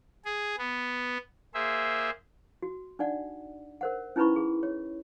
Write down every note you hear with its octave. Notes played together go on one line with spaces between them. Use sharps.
G#4
B3
A#3 G#4 C5 E5
F#4
D4 D#4 D5 F#5
A#4 C5 F#5
C#4 D#4 E4 B4 B5 C#6
G#4
C#5